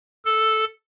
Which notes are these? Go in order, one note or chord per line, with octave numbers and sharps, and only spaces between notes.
A4